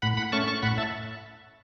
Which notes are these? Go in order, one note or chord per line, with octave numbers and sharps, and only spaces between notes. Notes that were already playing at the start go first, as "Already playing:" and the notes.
A2 F#5 B5
F#5 B5
A3 C#4 A5 C#6
A5 C#6
A2 F#5 B5
E5 A5